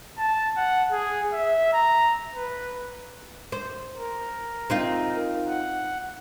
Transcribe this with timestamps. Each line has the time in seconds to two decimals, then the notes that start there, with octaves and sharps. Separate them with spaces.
0.18 A5
0.57 F#5
0.92 G#4
1.33 E5
1.74 A#5
2.35 B4
3.52 C5
3.98 A#4
4.70 C4 D#4 F4
5.48 F#5